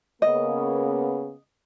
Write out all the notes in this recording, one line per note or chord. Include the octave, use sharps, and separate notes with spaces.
C#3 A#3 B3 D#5